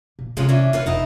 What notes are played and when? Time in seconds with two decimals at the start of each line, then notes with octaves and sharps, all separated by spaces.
0.19 A#2
0.37 C3 F3 G#3 C#4
0.49 E3 C#4 D4
0.73 A3 F4 B4 C#5
0.86 E1 B3 D#4 E4